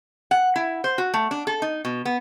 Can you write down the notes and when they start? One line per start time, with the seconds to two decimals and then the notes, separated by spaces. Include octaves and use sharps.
0.31 F#5
0.56 E4
0.84 C5
0.98 F#4
1.14 A3
1.31 D4
1.47 A4
1.62 D#4
1.85 B2
2.05 B3